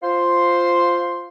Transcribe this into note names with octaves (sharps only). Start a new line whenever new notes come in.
F4 C5 C6